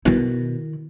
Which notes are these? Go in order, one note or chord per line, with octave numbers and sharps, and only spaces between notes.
B2 D#3 E4